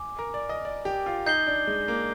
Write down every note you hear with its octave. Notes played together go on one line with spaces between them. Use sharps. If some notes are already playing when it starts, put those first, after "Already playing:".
Already playing: G#5 D6
A#4
D5
D#5
D5
G4
F4
D#4 G6 C7 G7
D4
G#3
A#3